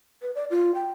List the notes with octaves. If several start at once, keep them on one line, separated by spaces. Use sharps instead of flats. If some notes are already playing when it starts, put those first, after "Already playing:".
B4
D5
F4
G5